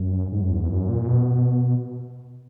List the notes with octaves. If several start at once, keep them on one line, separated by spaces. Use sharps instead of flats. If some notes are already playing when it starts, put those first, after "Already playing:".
Already playing: F#2
G#2
F#2
E2
F#2
A#2
B2